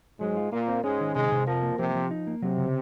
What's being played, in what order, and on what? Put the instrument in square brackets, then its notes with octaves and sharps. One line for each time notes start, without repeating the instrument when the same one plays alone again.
[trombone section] G#2 G#3 [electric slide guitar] F#3
[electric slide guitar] F4
[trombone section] A#2 A#3 [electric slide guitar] F4
[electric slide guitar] C4
[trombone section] G#2 G#3 [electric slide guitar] C#4
[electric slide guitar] D#3
[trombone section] G#2 G#3 [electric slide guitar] C3
[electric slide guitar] C3
[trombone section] F2 F3 [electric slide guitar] A#4
[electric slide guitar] A#3
[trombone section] C3 [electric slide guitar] F3
[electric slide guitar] F3
D#4
A#3
[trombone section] C3 [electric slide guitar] F#3
[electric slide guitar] C#3